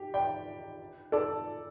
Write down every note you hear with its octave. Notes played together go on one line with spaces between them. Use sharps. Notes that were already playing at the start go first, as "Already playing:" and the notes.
Already playing: G4
D5 G5
A4 D5